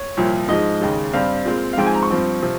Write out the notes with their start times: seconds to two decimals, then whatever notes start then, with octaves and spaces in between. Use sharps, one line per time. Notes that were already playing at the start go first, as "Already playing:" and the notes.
Already playing: C#5
0.17 C2 A#2 F3
0.48 G#2 F3 G#3 D#5
0.81 D#2 C#3 G#3
1.13 G2 G3 C4 F5
1.45 A#2 G#3 C4
1.73 F5
1.77 G#2 F3 G#3 C4 G5
1.86 G#5
1.94 A#5
2.03 C#6
2.10 G2 F3 C4
2.43 C3 F3